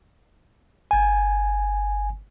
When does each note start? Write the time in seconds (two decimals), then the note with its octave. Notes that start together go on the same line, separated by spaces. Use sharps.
0.91 G1 G#5